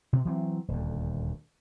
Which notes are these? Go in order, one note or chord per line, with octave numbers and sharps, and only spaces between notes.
B2
E3 F#3 C4
D#1 D2